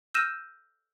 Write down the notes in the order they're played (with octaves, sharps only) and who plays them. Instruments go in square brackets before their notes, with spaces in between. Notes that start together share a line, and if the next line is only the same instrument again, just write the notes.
[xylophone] E6 F6 G6 A#6 D#7 E7